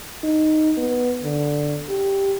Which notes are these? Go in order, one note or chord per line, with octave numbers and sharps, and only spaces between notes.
D#4
B3
D3
G4